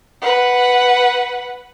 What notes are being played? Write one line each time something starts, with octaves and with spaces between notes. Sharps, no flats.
B4 F#5